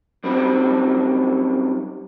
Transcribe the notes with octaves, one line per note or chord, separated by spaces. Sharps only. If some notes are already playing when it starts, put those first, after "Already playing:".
F#2 G3 C4 D#4